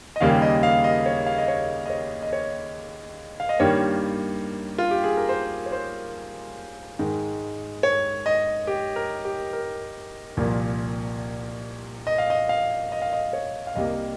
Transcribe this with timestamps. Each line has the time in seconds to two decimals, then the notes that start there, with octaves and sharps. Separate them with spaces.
0.16 D#5
0.20 D#2 C#3 G3 A#3 F5
0.42 D#5
0.63 F5
0.84 D#5
1.06 C#5
1.26 F5
1.38 D#5
1.48 C#5
1.86 D#5
1.90 C#5
2.22 D#5
2.33 C#5
3.40 F5
3.49 D#5
3.59 G2 D#3 G3 A#3 C#5
4.78 F4
4.91 G4
5.04 G#4
5.17 A#4
5.29 C5
5.66 C#5
5.72 C5
6.99 G#2 D#3 G#3
7.83 C#5
8.26 D#5
8.67 G4
8.96 A#4
9.25 G4
9.53 A#4
10.37 C2 A#2 F3 A#3
12.07 D#5
12.18 F5
12.30 D#5
12.49 F5
12.92 D#5
13.02 F5
13.13 D#5
13.33 C#5
13.67 F5
13.75 C2 C3 G3 A#3 D#5